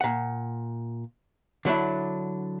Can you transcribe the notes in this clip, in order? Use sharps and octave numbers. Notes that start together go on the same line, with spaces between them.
A#2 F#5
D3 F#3 D4 E4